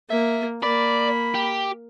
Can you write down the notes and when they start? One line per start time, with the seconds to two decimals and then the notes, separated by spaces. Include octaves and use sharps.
0.10 A#3 E5
0.63 A#3 D5 B5
1.35 G4